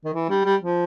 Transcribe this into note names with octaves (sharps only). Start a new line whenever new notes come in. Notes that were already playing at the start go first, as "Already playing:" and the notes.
D#3
E3
G3
G3
F3